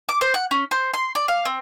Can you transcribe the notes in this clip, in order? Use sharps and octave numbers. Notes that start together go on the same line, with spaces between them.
D6
C5
F#5
C#4
C5
C6
D5
F5
C4